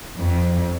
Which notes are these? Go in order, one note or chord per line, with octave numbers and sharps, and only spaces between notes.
F2